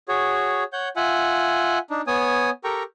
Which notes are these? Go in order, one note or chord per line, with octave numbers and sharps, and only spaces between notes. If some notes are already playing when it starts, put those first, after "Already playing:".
F#4 G#4 C#5
C#5 F#5 G6
F4 E5 F#5 G#5
D4 D#4
B3 C#5 G#5 D#6
G4 A4 A#4 G5 A#5 C#6